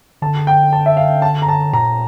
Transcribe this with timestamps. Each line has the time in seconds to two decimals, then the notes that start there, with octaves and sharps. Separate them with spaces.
0.22 D3 A5
0.47 G5
0.73 A5
0.86 E5
0.97 F5
1.22 A5
1.42 A#5
1.48 A5
1.73 A#2 A#5